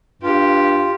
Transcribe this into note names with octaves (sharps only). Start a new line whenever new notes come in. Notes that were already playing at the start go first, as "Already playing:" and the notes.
G2 F4 G4